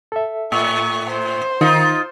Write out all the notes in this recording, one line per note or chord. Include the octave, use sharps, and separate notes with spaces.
A4 E5
A2 C#6
C5
D#3 D#4 F4